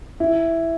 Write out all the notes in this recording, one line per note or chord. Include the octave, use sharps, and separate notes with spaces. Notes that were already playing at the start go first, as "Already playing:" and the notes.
E4